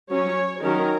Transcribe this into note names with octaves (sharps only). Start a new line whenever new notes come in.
F#3 C#4 C#5
D#3 F#3 C#4 A#4